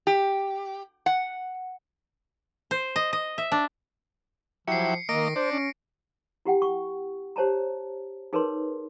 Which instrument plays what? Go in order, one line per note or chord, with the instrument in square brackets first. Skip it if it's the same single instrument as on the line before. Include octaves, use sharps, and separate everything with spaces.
[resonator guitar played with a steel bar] G4
F#5
[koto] C5
D#5
D#5
E5
D4
[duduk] F3 [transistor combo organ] F#3 E4 G4 [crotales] C7 C#7
[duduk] D#3 [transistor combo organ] A#3 D#5 [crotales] A#6 D7
[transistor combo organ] D4 [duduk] C5
[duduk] C#4
[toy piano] E4 G4 F#5 G5
C#6
G4 C5 C#5 A5 A#5
D#4 G#4 A#4 B4 C#5 C6